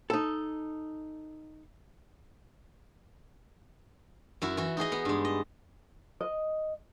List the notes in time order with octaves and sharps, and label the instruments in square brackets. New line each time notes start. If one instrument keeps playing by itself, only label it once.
[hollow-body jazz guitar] D#4 A4
[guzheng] F#2 E4 F#4
E3 F#4
D#4 F#4 G#4 D#5
B3 F#5
G2 G#3
D#5
[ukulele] D#5